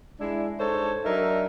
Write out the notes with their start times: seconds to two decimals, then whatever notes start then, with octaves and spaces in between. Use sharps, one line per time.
0.20 G#3 D4 E4
0.59 G#2 D4 A4 C5 C#5
1.05 F#3 D4 D#4 A#4 E5